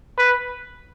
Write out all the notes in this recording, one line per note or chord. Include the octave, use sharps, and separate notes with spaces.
B4